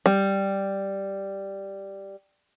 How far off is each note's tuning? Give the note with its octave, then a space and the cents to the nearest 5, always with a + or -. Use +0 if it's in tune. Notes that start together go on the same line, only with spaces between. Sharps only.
G3 +0